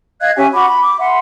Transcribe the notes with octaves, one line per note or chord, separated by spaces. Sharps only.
D#5 F5 F#6 G#6
C#4 G4 E5 G#5
F#4 B5 D6
B5
D6
E5 F#5 B5 C6